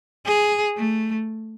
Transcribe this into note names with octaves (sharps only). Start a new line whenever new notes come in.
G#4
A3